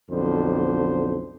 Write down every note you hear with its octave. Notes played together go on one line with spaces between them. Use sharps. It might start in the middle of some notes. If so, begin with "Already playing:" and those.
B1 F2 D3 C5